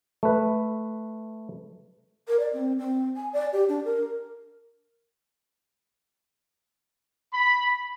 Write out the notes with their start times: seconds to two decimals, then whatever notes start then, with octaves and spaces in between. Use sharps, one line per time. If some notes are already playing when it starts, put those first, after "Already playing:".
0.23 A3 B4
2.28 A#4
2.39 D5
2.53 C4
2.78 C4
3.16 G#5
3.33 D5
3.53 G4
3.68 D4
3.85 A#4
7.34 B5